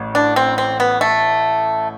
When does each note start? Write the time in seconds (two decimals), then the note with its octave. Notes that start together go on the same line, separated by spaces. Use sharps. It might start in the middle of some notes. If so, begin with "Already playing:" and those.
Already playing: A1 A2
0.15 D4
0.36 C4
0.58 C4
0.80 B3
1.01 A3